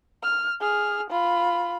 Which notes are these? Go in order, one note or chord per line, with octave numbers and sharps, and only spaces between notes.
F6
G#4 F6
F4 B5